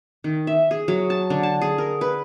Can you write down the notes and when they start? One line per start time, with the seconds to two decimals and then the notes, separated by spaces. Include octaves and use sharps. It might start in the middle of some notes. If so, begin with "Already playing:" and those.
0.24 D#3
0.47 E5
0.71 G#4
0.88 F#3
1.10 A5
1.30 D3
1.43 A5
1.61 G#4
1.78 A#4
2.01 B4